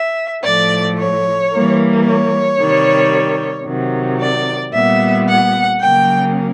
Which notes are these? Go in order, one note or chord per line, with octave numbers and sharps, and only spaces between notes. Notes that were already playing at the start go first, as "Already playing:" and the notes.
Already playing: E5
A2 F3 A3 D5
C#5
E3 G3 A#3
C#5
C3 D#3 G3
C3 D#3 F#3
D5
A#2 G3 B3 E5
F#5
C#3 F#3 A#3 G5